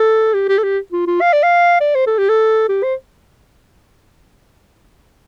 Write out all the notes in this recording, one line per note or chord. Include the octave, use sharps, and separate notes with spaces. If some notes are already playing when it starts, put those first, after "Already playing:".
Already playing: A4
G4
G4
A4
G4
F4
F4
F5
D5
F5
D5
C5
A4
G4
A4
G4
C5